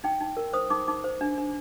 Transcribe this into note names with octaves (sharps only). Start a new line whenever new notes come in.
D#4 G5
D#4
A#4
C5 D#6
D#4 D6
D#4 D6
C5
D4
D4